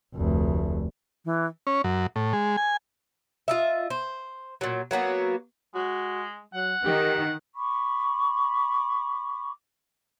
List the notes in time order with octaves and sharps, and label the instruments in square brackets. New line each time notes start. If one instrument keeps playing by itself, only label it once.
[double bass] F1 D2
[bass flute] E3
[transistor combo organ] C#4
F#2
A2
G#3
G#5
[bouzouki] F4 D#5 E5
C5
A#2 F#3
F#3 A#3 B3 F#4
[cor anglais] G#3 [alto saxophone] F#4
[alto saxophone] F#3 [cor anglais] F#5
[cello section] D#3 [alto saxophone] G4
[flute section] B5 C#6 D6